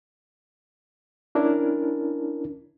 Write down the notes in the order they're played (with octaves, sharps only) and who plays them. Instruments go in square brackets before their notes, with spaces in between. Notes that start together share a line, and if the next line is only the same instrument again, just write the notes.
[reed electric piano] C#4 D4 E4 A#4